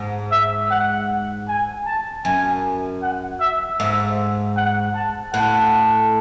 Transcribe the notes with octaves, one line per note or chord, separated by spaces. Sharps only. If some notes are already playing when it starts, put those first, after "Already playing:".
Already playing: G#2
E5
F#5
G#5
A5
F#2 G#5
F#5
E5
G#2 E5
F#5
A5
A2 F#5